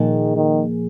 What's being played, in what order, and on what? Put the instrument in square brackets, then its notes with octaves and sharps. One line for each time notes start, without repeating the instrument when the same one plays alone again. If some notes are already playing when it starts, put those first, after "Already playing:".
Already playing: [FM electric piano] A#2 F3 A#3 G#4 [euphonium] D#3
[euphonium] D#3